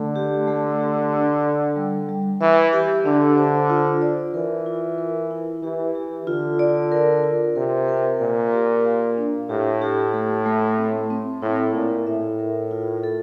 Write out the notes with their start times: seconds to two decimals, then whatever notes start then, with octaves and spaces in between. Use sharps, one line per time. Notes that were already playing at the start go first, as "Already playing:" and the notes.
Already playing: D3 A3
0.16 G4
0.48 A3
0.80 G4
1.12 D4
1.44 D5
1.76 G3
2.09 G3
2.41 E3 E5
2.73 G4
3.05 D3 D4
3.37 C5
3.70 F4
4.02 D5
4.34 E3 A#4
4.66 F4
4.98 A#4
5.31 E4
5.63 E3 G4
5.95 G4
6.27 D3 F4
6.59 D5
6.92 A#4
7.24 F4
7.55 C3 A#4
7.88 A#4
8.21 A#2 A#4
8.53 G4
8.85 F5
9.17 D4
9.50 A2 G4
9.82 G4
10.14 A3
10.46 A3
10.78 C4
11.10 C4
11.42 A2 E4
11.75 A#2 E4
12.06 A2 E5
12.39 A#4
12.71 F4
13.04 A4